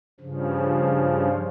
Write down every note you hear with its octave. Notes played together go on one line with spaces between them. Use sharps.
G2 C#3 F3